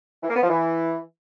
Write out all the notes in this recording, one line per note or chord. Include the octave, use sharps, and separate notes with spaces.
E3
A#3
B3
F3
E3